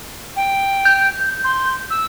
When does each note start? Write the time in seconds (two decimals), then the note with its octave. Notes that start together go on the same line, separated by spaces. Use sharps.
0.36 G5
0.85 G6
1.44 C6
1.90 E6